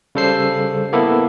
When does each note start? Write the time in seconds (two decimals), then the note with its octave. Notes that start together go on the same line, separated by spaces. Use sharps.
0.15 C#3 G3 A4 C5 C7
0.93 A#3 B3 E4 A4